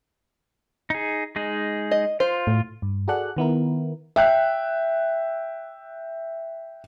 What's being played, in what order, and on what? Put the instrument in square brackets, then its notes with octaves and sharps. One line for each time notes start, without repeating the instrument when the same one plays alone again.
[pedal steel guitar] D#4 G#4
G#3 D#4 G#4
[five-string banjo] D#5
[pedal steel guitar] F4 [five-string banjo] C5
[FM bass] A2
[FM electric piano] G2
F#4 G#4 A4 D5 F#5 F#6
D#3 B3 E4 A#4
[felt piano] E5 G5 F#6